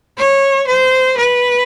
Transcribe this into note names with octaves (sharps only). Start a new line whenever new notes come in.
C#5
C5
B4